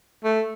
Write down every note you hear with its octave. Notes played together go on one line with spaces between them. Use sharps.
A3